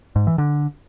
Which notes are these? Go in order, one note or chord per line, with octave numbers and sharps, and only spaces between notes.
G#2
E3
D3